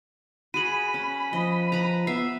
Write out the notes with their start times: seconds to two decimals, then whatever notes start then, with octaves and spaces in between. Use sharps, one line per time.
0.54 F#4 G#4 B5 D#7 F#7
0.94 C#4
1.33 F3 D#5
1.72 B4 A#5
2.07 B3 E5 C7